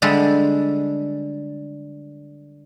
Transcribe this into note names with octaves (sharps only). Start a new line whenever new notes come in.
D3 G3 G#3 A4